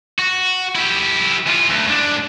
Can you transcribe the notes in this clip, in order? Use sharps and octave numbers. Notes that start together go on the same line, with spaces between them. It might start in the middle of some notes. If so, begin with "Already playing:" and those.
F#4
E4 G4
E3 F4
D2
G#2 D4